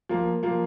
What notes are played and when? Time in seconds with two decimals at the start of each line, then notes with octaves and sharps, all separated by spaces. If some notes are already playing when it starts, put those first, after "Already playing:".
0.09 F3 A#3
0.43 F3 A#3